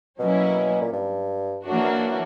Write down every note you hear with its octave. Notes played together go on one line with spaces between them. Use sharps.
B2 F#3 A#3 C#4 E4
A#2
G2
F#2 E3 A#3 D4 F#4